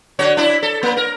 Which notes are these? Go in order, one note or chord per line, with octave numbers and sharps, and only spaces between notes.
D3 F#4 C#5
D4 E4
A4
A#3
A#4